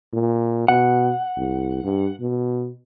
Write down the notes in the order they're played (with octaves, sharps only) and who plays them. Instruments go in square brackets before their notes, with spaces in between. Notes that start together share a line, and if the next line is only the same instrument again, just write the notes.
[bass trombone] A#2
[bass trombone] B2 [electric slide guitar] F#5
[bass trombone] C2
G2
B2